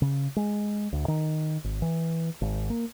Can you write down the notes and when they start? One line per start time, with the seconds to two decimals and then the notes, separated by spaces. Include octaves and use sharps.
0.02 C#3
0.36 G#3
0.93 D2
1.08 D#3
1.64 G#1
1.82 E3
2.41 G#1
2.70 A#3